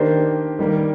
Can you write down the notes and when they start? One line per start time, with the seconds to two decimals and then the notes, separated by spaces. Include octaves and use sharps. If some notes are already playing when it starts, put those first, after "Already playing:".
Already playing: D#3 A#3 D4 G4 C5
0.59 D#3 G3 A#3